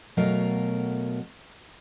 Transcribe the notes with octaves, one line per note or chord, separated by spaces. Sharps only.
B2 F#3 A3 A#4 F5